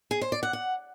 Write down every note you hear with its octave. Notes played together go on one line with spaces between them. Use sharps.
G#4
C5
D5
F#5
F#5